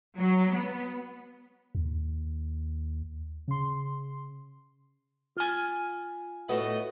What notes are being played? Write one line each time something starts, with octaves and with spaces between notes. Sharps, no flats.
F#3
B3
D#2
C#3 C6
F4 G#5
A2 A3 B3 E4 F#4 D#5